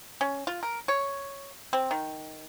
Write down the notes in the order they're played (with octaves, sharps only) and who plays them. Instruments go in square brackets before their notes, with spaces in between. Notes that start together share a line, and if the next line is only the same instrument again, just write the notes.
[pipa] C#4
F4
A#4
C#5
C4
D#3